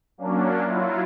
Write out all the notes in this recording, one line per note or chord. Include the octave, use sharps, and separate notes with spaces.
F#3 A#3 C#4 D4
F#3 E4 F4